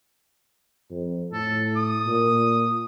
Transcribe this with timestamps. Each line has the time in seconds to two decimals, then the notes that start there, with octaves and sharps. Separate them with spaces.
0.91 F2
1.33 A2 A4
1.76 D#6
2.07 A#2